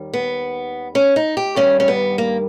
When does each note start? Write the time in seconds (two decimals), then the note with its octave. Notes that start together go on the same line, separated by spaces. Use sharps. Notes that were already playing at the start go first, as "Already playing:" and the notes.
Already playing: D#2 D#3 G3
0.14 B3
0.95 C#4
1.16 D#4
1.37 G4
1.56 G2 D#3 G3 C#4
1.80 C#4
1.88 B3
2.18 A#3